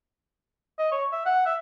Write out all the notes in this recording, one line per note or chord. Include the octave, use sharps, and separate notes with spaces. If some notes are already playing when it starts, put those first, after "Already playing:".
D#5
C#5
E5
F#5
E5